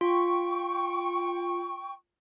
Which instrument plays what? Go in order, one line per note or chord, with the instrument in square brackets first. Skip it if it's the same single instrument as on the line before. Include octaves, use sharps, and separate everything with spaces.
[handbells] F4 [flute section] G5 C#6